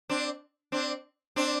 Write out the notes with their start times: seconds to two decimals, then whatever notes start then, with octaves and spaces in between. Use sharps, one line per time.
0.09 C4 D4
0.72 C4 D4
1.36 C4 D4